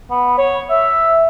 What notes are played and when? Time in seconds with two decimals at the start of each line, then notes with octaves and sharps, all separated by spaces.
0.10 B3
0.38 C#5
0.70 E5